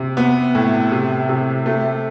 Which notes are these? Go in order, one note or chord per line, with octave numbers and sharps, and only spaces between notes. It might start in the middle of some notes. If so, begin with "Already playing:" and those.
Already playing: C3
B3
A2
C3
C3
A3